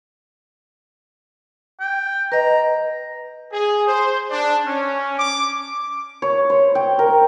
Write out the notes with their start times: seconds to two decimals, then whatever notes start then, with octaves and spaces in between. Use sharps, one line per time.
1.80 G5
2.32 B4 D#5 A#5
3.52 G#4
3.86 C5
4.31 D4
4.65 C#4
5.18 D6
6.22 C#5
6.50 C5
6.75 G5
6.99 A#4